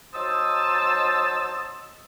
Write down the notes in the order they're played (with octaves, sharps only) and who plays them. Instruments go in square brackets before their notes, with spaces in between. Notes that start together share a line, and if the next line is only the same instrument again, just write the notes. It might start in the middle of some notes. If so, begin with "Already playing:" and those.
[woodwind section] F#3 D#4 C5 A5 D#6 E6